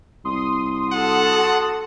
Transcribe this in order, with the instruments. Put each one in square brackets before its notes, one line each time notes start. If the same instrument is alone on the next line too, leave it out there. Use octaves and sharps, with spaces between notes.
[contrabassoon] C2 [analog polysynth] C6 D#6
[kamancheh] F#4 A4 [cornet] F#5